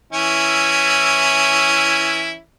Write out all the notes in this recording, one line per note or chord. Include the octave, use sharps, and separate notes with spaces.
E3 C#4 E4